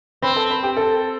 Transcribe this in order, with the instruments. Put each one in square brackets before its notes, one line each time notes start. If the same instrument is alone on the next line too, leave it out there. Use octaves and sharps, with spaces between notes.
[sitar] C4 [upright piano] B4 B5
[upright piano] A4 A5
B4 B5
G4 G5
A4 A5